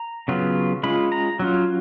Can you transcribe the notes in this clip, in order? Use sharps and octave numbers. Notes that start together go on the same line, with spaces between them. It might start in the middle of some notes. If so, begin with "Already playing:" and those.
Already playing: A#5
C#3 F#3 B3 F4
G#3 C#4 F4 B5
A#5
F#3 C#4 F4